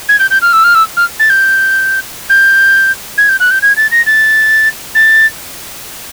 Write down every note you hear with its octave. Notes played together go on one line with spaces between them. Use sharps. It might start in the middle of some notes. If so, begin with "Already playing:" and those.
G#6
G6
G6
F6
E6
F6
E6
F6
A6
G6
G6
G#6
G6
F#6
G6
G#6
A6
A#6
A6
A6